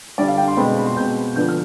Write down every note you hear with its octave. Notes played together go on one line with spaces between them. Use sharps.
D3 G3 D4 D5
F5
G5
C6
B2 G#3 C4 B5
B5
C6
B2 G#3 C4 G6
D3 F3 B3 D4 G6
F6